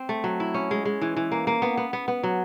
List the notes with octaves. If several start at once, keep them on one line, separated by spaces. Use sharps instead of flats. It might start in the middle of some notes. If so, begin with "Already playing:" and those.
Already playing: C4
A3
F#3
E4
C#4
G#3
G#3
E3
E3
A#3
A#3
B3
B3
B3
B3
F#3